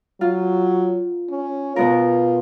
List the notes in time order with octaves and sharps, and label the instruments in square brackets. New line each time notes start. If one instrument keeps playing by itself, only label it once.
[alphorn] F#3 [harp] F4
[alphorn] C#4
[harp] B2 B3 A#4 [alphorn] F4